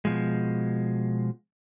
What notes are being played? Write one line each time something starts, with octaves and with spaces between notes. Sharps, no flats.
B2 F3 G#3